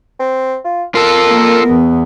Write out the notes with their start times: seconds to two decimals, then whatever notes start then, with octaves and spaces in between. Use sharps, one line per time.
0.19 C4
0.65 F4
0.95 F4 A4 A#4
1.27 A#3
1.64 E2 B3